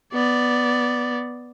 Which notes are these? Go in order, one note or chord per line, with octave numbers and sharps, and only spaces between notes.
B3 D5